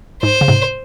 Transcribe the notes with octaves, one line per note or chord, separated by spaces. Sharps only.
G#2 C5
C#3
G#2 C3